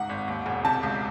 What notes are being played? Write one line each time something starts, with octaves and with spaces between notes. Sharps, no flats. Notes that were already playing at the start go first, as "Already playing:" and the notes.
Already playing: C#2 G#2 F#5
G#1
D#2
E1
C3 A5
C#2